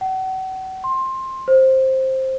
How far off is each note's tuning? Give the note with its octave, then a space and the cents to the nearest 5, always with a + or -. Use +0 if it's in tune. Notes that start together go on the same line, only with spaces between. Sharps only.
F#5 +35
C6 +15
C5 +10